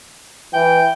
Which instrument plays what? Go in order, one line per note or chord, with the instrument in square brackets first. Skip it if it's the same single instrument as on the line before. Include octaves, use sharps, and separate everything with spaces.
[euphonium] E3 [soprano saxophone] G5